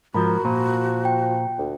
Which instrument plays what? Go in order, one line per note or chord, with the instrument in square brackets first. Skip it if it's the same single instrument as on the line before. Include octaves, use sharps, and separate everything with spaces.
[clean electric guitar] G#2 F3 [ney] F#4 [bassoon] A#4 [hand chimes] B5
[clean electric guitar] A#2 [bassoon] F3
[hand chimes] G5
[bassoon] D2